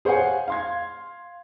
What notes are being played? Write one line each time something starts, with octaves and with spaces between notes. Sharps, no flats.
G#4 C5 C#5 F5 F#5 G#5
F5 C6 G#6